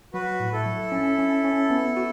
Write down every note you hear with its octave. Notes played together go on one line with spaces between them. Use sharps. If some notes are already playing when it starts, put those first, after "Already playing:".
F#3 F#4 B4
A2
E4 A4
F#3
C#4
C#4
C#4
B3
F#4